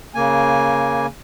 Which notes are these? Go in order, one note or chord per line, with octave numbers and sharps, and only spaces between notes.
C#3 A#3 G#5